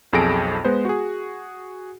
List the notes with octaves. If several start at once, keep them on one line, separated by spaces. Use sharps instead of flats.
B1 F2 G#4 A4 A#6 D7
G#3 B3 B4 C5
F#4 G#4